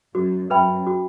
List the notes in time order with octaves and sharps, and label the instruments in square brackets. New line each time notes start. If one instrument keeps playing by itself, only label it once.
[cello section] F#2 [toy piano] F#4
[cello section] F#2 [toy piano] B4 E5 G5 B5
[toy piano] F#4